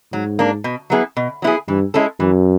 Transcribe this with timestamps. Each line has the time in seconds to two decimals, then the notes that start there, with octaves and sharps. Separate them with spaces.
0.13 G#2 F#3
0.39 A#3 D4
0.64 B2
0.90 F#3 B3 E4 G#4
1.17 B2
1.42 F#3 B3 E4 G#4
1.68 G2 E3
1.94 G#3 C#4 E4 A4
2.20 F#2 E3